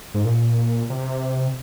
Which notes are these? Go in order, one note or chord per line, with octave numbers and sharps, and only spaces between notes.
G#2
A#2
C3